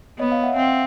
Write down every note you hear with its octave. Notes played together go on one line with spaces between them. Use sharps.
B3 C#5 D#5
D#5 F5
E5 F#5
C4 F5 G5